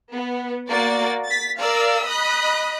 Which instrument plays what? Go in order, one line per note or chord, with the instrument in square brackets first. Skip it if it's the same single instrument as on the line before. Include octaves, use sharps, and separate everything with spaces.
[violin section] B3
A#3 F#4 D5 A6
A6 B6
A#4 D5 F5 E6
D#5 B5 D#6 F#6